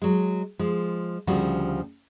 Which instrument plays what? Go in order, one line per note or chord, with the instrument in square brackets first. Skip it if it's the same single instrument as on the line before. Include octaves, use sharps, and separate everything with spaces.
[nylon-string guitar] F#3 G#3
F3 G#3
D2 C#3 F3 G3 F#4